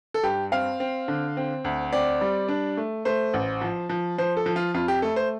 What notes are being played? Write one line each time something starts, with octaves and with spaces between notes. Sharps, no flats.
A4
G2 G4
C4 F5
C4
D3
C4
D2
C4 D5
G3
D4
A3
A3 C5
A1
F3
F3
F3 C5
A4
F3
F4
F2 F4
G4
A3 A4
C5